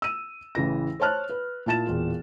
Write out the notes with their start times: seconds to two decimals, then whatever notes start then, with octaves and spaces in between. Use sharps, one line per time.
0.02 E6 D#7
0.55 A1 C#3 E3 A#6
1.00 C5 C#5 A5 F6 F#6
1.30 B4
1.66 A#2 E4 A5 A6 E7
1.87 E1 A#2 F4